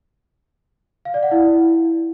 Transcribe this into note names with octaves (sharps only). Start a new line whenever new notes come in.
F5
D5
F#5
E4